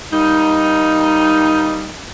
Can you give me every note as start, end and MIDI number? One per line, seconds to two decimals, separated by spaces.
0.13 1.92 55
0.13 1.92 58
0.13 1.92 63